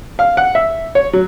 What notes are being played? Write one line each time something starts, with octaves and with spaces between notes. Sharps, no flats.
F5
F#5
E5
C#5
F#3